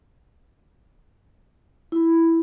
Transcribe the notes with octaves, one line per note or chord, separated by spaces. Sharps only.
E4